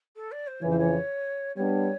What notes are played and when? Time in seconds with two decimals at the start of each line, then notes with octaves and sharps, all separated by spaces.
0.16 A4
0.32 D5
0.47 C5
0.62 F2 C#3 E3 C#5
0.70 C5
0.79 C#5
1.56 G3 B3 D4 C#5